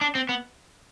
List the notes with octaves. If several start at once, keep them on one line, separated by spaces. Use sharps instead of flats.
D4
C4
B3